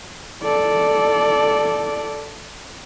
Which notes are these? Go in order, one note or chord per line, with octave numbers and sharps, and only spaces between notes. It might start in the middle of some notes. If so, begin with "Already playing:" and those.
A4 D5